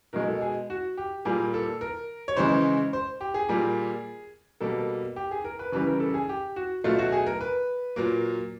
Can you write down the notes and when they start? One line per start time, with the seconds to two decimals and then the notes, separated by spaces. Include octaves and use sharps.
0.13 B2 G#3 A#4
0.27 A4
0.41 G#4
0.70 F#4
0.97 G4
1.25 A#2 G3 A#3 G#4
1.54 A4
1.81 A#4
2.28 C#5
2.36 C#3 E3 G#3 C5
2.93 C5
3.21 G4
3.34 G#4
3.49 A#2 G3 A#3
4.61 B2 G3 A#3 A4
5.16 G4
5.31 G#4
5.44 A#4
5.59 B4
5.72 C#3 E3 G3 B4
5.87 A#4
6.00 A4
6.14 G#4
6.29 G4
6.56 F#4
6.84 B2 F#3 A3 F4
6.99 F#4
7.12 G#4
7.27 A#4
7.41 B4
7.96 A#2 F#3 A#3